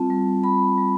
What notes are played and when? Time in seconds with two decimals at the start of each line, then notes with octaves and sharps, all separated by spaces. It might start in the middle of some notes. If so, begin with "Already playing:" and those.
Already playing: G3 C4 F4 A5
0.10 G3
0.43 G3 B5
0.78 G3